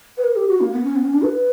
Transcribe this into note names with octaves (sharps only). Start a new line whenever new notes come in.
B4
A#4
G4
F#4
A#3
B3
C#4
B3
C#4
D4
B4